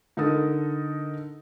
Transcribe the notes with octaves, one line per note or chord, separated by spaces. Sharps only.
D3 D#4 A4 A#4 D#6 A6